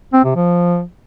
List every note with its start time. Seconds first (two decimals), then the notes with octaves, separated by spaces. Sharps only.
0.13 C4
0.25 C3
0.36 F3